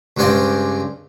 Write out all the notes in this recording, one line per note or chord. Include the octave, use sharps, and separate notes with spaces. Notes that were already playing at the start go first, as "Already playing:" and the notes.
C#2 G2 C4 C#4 G5